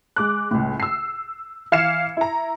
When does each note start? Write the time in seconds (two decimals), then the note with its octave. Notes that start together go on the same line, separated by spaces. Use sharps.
0.16 G#3 D6 F#6
0.51 C#2 A2
0.80 E6 C7
1.72 E3 F5 G#6 C7 C#7 E7
2.17 E4 A#5